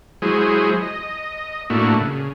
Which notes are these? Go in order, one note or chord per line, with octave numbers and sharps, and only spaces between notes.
F#3 G#3 E4 G#4 C5
D#5
A2 A3 A#3 D4 E4 F#4
C#3